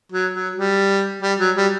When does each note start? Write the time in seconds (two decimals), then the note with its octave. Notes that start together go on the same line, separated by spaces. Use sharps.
0.12 F#3
0.34 F#3
0.56 G3
1.23 G3
1.39 F#3
1.56 G3